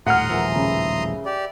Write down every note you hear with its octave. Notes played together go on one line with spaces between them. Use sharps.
D#1 A2 F#5 A#5 C6 D#6 F6
D#1 A1 F3 G#4 A#4 E5
C#3 B4
G4 D5